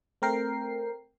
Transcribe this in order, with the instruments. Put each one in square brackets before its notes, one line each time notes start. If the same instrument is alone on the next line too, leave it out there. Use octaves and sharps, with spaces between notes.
[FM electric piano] A3 C4 A#4 G5 C7